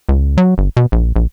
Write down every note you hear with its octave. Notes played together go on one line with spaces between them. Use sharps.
C#2
F#3
G1
B2
A#1
A#1